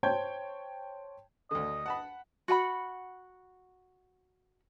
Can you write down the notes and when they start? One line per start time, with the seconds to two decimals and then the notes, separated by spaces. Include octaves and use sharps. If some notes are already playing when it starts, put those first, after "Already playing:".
0.03 C5 C#5 G5 A5 G6 G#6
1.51 D2 D3 D#5
1.86 F#5 A5 B5
2.48 F#4 F#5 G#5 B5